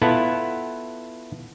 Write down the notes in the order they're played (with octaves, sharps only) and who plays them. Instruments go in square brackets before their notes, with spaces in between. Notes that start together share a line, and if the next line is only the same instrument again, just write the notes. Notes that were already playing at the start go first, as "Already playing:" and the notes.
[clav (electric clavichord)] B3 E4 F4 A4 F#5 A5